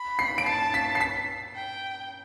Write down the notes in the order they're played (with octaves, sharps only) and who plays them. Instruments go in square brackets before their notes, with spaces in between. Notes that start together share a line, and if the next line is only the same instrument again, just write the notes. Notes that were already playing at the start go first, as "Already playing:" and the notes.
Already playing: [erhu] B5
[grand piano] C7
D7
[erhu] A5 [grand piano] C7
[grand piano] B6
C7
B6
[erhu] G5